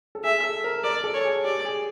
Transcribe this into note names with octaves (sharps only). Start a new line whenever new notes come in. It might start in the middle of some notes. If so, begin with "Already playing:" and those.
A4
G#4 E5
A4
A#4
A#4 D5
A4
C#5
G#4
G4 D5
G#4